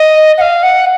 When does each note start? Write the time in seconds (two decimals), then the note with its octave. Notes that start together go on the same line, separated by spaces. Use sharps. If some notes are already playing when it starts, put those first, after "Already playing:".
Already playing: D#5
0.38 F#5
0.41 F5
0.63 F#5